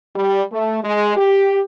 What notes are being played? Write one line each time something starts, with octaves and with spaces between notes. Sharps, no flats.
G3
A3
G#3
G4